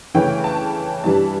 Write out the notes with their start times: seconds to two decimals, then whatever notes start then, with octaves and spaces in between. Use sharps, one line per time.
0.14 C#3 E3 A3 C#4 G5
0.44 A5
1.04 G2 E3 G3 A5